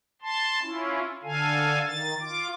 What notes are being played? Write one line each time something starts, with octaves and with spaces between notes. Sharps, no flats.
A5 C6
C#4 E4 F4
D3 A4 F5 G#5
D#3 A6
F4 D6